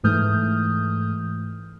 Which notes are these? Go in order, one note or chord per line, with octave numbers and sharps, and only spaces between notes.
G#2 E3 A3 D#6 F6 G6